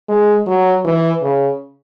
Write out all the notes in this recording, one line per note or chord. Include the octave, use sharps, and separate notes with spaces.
G#3
F#3
E3
C#3